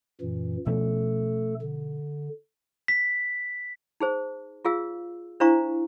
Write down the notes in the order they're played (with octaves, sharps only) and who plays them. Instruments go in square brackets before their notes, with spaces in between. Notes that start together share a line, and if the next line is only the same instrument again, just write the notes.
[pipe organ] F#2 A#2 E3
[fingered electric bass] B2 F3 C#4 [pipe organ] A3 A4
[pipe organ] D3
[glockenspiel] B6
[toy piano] D#4 G#4 C5
F4 G#4 F5 E6
D4 E4 C5 F5 A#5 C#6